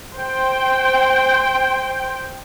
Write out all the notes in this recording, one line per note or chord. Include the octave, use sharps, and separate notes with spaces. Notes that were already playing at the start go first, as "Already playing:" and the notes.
C5 G5